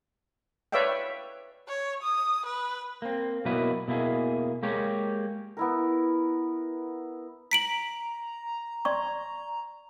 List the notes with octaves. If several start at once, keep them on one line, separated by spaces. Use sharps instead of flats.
B4 C#5 D5 E5 F5 G5
C#5
D#6
B4
A#3 C4
B2 F#3 A#3 B3 E4 B4
B2 A#3 E4 G#4
G#3 A#3 G4 C#5
B3 E4 A#4
A#5 B6 D7 F#7
D5 C6 C#6